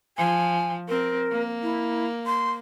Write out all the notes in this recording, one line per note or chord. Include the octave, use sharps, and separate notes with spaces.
F3 G#5
C4 A#4
A#3
E4
C6